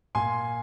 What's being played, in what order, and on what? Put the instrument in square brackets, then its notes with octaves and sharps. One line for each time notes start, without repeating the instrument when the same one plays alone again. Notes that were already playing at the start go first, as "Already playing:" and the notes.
[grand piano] A#2 G#5 C6